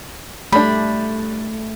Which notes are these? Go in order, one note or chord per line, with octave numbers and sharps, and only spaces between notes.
G3 A3 D4 B5